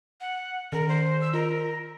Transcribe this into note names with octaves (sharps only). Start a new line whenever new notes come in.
F#5
D#3 A#4
C5
E6
F4 A#4